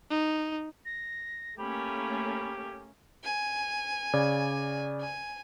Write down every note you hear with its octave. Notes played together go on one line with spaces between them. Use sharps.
D#4
A#6
A3 A#3 C#4 G4 B5
G#5
C#3 D5 G#6
G#5